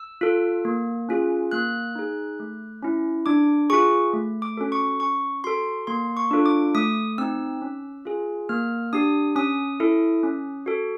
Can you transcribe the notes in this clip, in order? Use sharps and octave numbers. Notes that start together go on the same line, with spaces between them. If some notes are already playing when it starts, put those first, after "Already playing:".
Already playing: E6
F4 A4
A#3
C#4 F4 G#4
A#3 F#6
D#4 G#4
A3
C#4 E4
D4 D6
F4 G#4 C#6
A3
D6
C#4 F#4 A4
C#6
C#4 C#6
F#4 A4 C6
A#3 C6
C#6
D4 F4 A4
D6
A3 D#6
C4 D#4 E6
C#4
F4 G#4
A#3 F6
D4 G4 D#6
C#4 D#6
E4 A4
C#4
F#4 A4